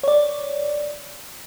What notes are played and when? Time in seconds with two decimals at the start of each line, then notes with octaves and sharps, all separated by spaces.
0.04 C#5 D5